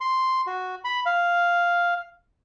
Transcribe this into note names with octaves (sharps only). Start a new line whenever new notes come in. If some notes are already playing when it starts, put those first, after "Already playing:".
C6
F#4
B5
F5